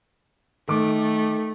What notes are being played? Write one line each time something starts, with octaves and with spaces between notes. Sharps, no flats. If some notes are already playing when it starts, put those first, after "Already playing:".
D#3 A3 D6